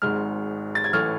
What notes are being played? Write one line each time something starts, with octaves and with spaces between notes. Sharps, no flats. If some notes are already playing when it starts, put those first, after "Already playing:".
G#1 G#2 G#3 F6
A6
G#6
A1 A2 E3 A3 F6